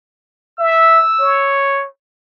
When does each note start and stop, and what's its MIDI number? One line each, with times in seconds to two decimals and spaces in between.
0.60 1.03 76
0.60 1.58 88
1.20 1.87 73